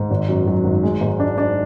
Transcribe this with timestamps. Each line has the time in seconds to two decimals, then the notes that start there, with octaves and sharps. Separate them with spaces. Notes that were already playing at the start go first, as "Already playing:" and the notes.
Already playing: G#2
0.11 G#1
0.29 F#2
0.47 F#3
0.64 G#1
0.83 G#3
1.01 G#2
1.20 D4
1.38 D4